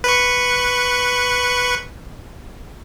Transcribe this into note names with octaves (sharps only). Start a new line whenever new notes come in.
B4 C#6